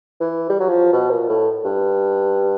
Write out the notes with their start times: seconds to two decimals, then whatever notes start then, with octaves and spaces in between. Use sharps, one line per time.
0.21 E3
0.49 G3
0.60 F#3
0.69 F3
0.93 B2
1.10 A#2
1.29 A2
1.64 G2